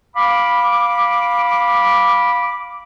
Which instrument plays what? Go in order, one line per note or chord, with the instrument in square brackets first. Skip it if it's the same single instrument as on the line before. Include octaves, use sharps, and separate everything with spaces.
[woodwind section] F5 B5 D6